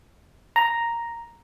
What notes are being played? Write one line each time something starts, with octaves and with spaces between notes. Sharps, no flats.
A#5